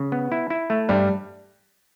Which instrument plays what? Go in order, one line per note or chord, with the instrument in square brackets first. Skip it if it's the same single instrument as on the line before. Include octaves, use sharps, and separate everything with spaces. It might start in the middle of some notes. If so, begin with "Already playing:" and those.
Already playing: [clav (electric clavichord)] C#3
B3
E4
E4
A3
[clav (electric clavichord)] G2 [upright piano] G3